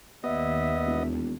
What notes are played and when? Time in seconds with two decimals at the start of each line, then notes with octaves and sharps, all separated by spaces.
0.24 D#2 G3 A#3 B3 D#5 E5
0.86 E1